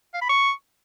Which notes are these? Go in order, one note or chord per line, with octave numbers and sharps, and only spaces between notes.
F5
B5
C#6